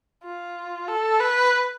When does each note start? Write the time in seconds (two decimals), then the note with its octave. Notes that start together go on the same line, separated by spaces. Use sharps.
0.24 F4
0.88 A4
1.20 B4